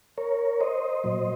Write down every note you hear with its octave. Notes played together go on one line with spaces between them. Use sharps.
A#4 C#5
C5 D#5
A#2 F#3